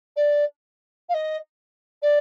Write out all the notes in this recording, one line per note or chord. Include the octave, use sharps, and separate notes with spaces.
D5
F5
D#5
D5